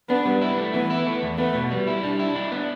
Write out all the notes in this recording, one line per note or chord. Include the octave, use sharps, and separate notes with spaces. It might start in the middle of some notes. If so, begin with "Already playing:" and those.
B3 D4
G3
E4
A3
E3 B3
E4
A3
E2
A3 B3
B2
G3
E4
G3 D4
E4
D4
B3